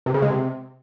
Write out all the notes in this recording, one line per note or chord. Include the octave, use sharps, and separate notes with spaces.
C3
C#3
G#3
C3